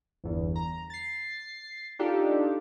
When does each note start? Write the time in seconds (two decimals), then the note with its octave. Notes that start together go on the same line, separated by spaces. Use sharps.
0.24 G1 E2
0.56 A#5
0.90 A6 C7
1.99 D4 D#4 F4 G4 A4